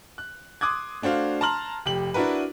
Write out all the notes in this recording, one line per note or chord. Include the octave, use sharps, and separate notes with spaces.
F#6
C6 D6 D#6 F#6 G#6
A3 D4 F#4 C5 F5
A5 A#5 C6 F6 F#7
F1 G4 F#7
D4 E4 F#4 A#4 B4